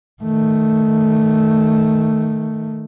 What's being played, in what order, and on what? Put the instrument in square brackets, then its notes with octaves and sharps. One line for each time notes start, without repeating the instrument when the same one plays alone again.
[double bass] D#3 A3